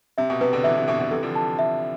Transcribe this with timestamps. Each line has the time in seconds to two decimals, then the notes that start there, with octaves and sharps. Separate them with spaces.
0.18 C3 E5
0.30 B2
0.41 C3 B4
0.53 B2 D3
0.64 C3 E3 E5
0.77 C3
0.88 B2 D3 E5
0.99 B2 D3
1.11 C3 E3 A4
1.23 D3 F3
1.35 A5
1.59 E5